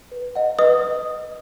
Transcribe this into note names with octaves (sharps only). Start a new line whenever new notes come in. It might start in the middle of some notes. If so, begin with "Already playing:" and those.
B4
D#5 F#5
B4 D#5 D#6